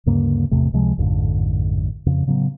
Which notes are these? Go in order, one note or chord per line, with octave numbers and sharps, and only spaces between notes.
D2 G2 C#3 A#3
A1 E2 C3 A3
C#2 C3 F3 G#3
A1 F2 G#2 D3
F2 C#3
A2 C#3 F#3 B3